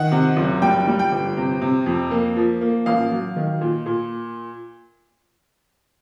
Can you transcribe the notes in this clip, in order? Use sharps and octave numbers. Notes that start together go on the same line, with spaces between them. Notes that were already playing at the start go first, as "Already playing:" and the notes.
Already playing: D#3 F#5
C3
F#1
G3 G5
G3
G5
G1
C3
C3
F2
A#3
F3
A#3
A1 F5
F#3
D#3
A#2
A#2